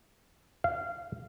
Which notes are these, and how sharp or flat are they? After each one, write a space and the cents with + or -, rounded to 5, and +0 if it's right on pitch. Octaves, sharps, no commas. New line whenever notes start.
F5 -20